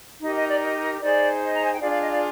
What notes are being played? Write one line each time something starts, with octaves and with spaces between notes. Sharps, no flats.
D#4 G4 A#4 D#5
D#5
D5
D#5
D#4 G#4 C5 D5
D#5
A#5
G#5
G5
D4 F4 G#4 D5 F5
D5 F5
D#5
D5 F5